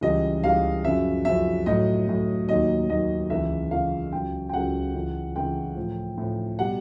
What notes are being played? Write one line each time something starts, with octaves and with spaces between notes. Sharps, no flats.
C#2 C#3 E3 G3 D#5
C#2 C#3 E3 G3 F5
F#2 C#3 F3 E5
F#2 C#3 F3 E5
A2 F#3 D#5
A2 F#3
D#2 D#3 F#3 D#5
D#2 D#3 F#3 D#5
C#2 C#3 E3 E5
C#2 C#3 E3 F5
C#2 C#3 F#3 G5
G5
C#2 C#3 F#3 F#5
C#2 C#3 E3
C#2 C#3 E3 G5
A2 F3
A2 F3
B2 G3 F#5